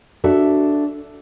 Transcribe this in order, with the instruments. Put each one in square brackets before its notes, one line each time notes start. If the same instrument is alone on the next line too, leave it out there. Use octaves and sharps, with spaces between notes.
[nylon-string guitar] D4 F#4 A4 E5